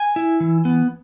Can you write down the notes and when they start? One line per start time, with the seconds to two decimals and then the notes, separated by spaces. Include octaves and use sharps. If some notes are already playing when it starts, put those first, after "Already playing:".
Already playing: G#5
0.16 E4
0.40 E3
0.65 B3